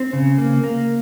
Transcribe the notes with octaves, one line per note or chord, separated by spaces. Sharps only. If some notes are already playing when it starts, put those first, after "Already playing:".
Already playing: C4
C#3
A#3
A#3